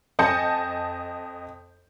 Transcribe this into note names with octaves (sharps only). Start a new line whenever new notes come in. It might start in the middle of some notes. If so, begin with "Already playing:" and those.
F2 D#5 G#5 A5 G6 C#7